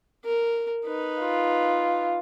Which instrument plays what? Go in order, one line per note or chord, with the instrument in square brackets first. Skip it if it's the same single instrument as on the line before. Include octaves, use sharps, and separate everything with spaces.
[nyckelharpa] A#4
D#4 B4
[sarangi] F4